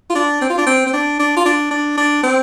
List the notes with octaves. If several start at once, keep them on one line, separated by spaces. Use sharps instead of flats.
F4
D4
C4
F4
D4
C4
C4
D4
D4
F4
D4
D4
D4
C4